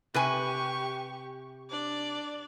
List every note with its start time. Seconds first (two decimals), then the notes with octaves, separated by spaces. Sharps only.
0.14 C3 G4 B4 G#5 C#6
1.71 D4 D5